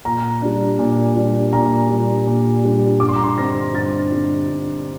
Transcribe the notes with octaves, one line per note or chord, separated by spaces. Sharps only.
A#2 A#5
G3 D4
A#2
G3 D4
A#2 A#5
G3 D4
A#2
G3 D4
G2 D6
C6
A#5
C6
D3 G3 C4 D#4 A#6
G2 A6
D3 G3 C4 D#4
G2